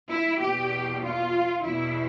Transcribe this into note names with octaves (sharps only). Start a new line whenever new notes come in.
E4
E2 B2 G4
F4
E2 B2 E4